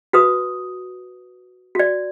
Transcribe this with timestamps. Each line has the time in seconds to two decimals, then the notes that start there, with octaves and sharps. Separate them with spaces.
0.13 F#4 B4 D#6
1.75 F#4 D5